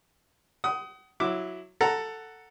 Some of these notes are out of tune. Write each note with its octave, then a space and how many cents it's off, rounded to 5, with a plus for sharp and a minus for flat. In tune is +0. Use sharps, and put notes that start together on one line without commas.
F#5 +40 D#6 +15
F#3 -10 E4 +0 D6 +0
A4 +10 F#5 +0 A#5 +0